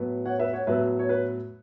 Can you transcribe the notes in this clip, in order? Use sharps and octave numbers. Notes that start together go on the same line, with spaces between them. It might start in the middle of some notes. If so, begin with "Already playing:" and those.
Already playing: A2 F#3 B3
C#5 F#5
B4 E5
C#5 F#5
A2 F#3 B3 B4 E5
C#5
B4